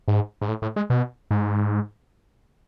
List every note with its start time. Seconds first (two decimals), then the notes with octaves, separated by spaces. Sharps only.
0.08 G#2
0.42 G#2
0.48 A2
0.62 A2
0.76 G#3
0.90 B2
1.31 G#2